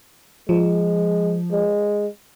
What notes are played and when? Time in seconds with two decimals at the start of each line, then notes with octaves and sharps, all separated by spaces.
0.49 F3 G#3
1.51 G#3